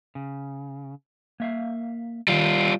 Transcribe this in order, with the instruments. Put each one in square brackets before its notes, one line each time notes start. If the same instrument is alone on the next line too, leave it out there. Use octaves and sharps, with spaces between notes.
[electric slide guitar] C#3
A#3 E5 F5
[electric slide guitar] D#3 E3 [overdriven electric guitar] G3 F4